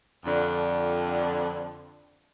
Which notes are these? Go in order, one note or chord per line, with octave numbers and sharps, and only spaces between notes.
F2 D3